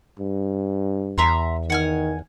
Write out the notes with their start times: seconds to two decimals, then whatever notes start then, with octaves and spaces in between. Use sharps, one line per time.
0.19 G2
1.18 E2 E5 A#5 C6
1.70 D#3 F#5 G#5 F6